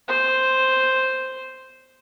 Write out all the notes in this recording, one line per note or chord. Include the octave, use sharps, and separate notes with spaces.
C5